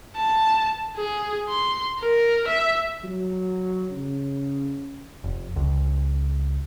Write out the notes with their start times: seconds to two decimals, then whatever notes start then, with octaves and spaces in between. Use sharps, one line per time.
0.17 A5
0.97 G#4
1.49 C6
2.00 A#4
2.47 E5
3.04 F#3
3.90 C#3
5.24 F1
5.56 C#2